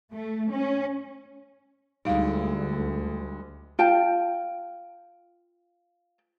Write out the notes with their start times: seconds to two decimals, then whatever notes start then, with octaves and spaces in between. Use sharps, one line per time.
0.13 A3
0.52 C#4
2.05 D2 G3 G#3 D#4 F5
3.79 F4 G5 A5